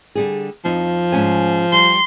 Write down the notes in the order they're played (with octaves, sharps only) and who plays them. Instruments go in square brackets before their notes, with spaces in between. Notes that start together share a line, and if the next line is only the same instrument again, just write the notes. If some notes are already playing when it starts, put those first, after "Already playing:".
[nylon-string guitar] D3 G3 G#4
[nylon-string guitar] F2 D#4 [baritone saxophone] F3
[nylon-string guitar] G#2 C#4 G#5
[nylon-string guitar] G3 [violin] C6